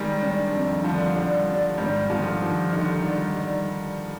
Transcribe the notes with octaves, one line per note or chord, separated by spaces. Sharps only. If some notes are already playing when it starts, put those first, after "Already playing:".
Already playing: D#3 G3 G#3
D4
F2
D3 F3 G3
G3
D4
G#2 D#3 G3
D3 F3 G4
D#3 F3
D3 D#4
D#3
G3
G3